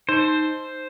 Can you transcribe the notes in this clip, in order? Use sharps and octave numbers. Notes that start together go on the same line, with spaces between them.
D#4 C5